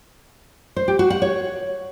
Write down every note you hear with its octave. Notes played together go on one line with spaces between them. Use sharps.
C5
G4
F#4
F#5
C#5